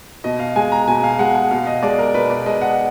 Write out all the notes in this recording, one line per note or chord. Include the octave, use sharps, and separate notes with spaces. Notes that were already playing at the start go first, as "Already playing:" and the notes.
B2 D#5
F5
G#3 G#5
A#5
B2 G#5
F5
G#3 F#5
F#5
B2 F5
D#5
G#3 D5
A#4
B2 B4
D5
G#3 D#5
F#5